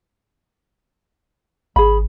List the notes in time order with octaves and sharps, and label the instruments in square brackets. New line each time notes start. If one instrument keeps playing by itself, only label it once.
[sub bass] G#1 [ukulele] G#4 B5